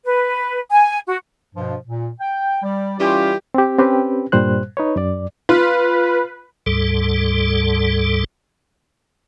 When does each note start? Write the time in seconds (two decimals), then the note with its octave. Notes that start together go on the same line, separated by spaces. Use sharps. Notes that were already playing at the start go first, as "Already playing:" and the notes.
0.06 B4
0.71 G#5
1.08 F#4
1.55 G2 B2 F3
1.87 A#2
2.20 G5
2.63 G3 D5
2.99 E3 G3 C#4 F4 G4
3.54 C4 G4
3.79 C4 C#4 G4 B4
4.32 G2 A#2 G3 C5 F#6
4.77 D#4 B4 C#5
4.96 F#2 D5
5.49 F4 B4
6.66 D2 G#2 G3 A4